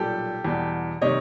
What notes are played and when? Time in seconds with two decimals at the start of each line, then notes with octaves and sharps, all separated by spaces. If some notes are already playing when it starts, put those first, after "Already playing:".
Already playing: B1 A#2 G3 G4 A4
0.45 E2 B2 G3
1.01 C3 D#3 G3 C#5 D#5